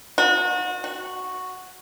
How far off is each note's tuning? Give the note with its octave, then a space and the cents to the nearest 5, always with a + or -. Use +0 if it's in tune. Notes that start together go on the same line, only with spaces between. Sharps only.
F#4 -35
F#4 -5